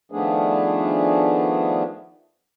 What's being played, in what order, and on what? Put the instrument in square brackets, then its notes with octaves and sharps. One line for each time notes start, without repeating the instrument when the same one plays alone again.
[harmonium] D#3 F3 A3 B3 D4 G#4